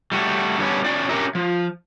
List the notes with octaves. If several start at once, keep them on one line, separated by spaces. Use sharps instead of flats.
G3 A3 F#4
D3 G3 B3 C#4 D4
C#4 D4 F#4 D5
C#4 D4 G4 A#4 E5
F3